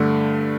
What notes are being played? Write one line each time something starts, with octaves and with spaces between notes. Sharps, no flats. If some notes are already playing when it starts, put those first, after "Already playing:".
Already playing: G2 D3 A3